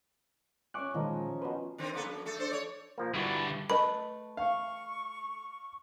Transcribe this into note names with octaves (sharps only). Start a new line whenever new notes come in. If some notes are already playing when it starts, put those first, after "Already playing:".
C#4 E5 G#5 C#6 D6 F#6
A#2 D#3 F3 G#3 D#4
B2 B4 C5
D3 D#3 C4
A#3 B3 A4
F#2
A3 A4
D4 A4 C5
C#5 D5
A#2 F3 A#3
G2 D3 E4 F#4 B4
A3 B4 D#5 B5
F5 C#6